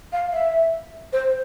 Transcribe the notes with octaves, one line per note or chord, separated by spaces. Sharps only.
F5
E5
C5